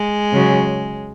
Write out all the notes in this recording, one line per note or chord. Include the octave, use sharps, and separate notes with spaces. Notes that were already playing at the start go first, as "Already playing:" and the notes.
Already playing: G#3
C#3 F#3